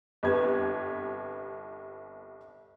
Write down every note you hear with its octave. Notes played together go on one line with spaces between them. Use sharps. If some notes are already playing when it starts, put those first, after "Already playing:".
G1 C2 G4 B4 G#6